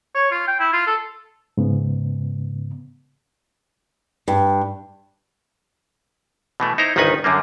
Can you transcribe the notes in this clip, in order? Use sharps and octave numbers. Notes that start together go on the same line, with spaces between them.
C#5
F4
G5
E4
F4
A4
G#2 C#3 B3
G2
B2 E3 A3
D#4 E4 C5 A#5
G1 C2 D#3 D#4 B4 G#5
F#2 D3 G3 A#3